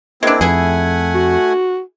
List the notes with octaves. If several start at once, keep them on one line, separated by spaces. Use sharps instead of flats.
G#3 A#3 C4 D4 E4
F2 A3 E4 G#4 F#5 G#5
F#4